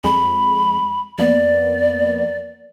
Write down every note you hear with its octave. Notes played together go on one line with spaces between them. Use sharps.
F2 G#3 B5
F2 A#3 B3 D5